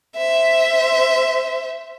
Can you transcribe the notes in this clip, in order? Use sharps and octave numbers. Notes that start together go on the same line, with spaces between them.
C5 E5